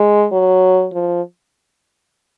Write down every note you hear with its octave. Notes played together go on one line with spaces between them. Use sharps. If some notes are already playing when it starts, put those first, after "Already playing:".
Already playing: G#3
F#3
F3